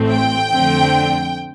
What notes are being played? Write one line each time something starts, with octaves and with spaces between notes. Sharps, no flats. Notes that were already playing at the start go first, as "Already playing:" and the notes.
Already playing: A1 A2 A3 C4
G5
F2 D3 A3 C4